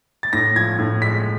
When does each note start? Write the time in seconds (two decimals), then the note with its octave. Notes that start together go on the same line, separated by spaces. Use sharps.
0.23 A6
0.33 A2 A#6
0.56 F3 G#6
0.79 A2
1.02 G#3 B6